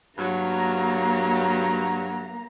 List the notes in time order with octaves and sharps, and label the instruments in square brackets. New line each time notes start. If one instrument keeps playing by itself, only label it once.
[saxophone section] G2 F#3 [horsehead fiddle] A#3 A#5